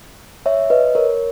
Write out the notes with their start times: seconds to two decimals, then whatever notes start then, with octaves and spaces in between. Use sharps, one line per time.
0.46 C#5 E5
0.70 B4 D#5
0.95 A#4 C#5